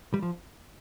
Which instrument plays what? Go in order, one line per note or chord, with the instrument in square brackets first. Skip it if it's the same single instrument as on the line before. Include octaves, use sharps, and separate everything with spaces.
[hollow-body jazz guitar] G3
F3